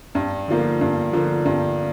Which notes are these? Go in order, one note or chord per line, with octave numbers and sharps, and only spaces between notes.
G2
D3 F3 A#3
G2
D3 F3 A#3
G2